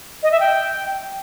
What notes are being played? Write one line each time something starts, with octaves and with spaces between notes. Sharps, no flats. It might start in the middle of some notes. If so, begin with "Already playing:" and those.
D#5
E5
G5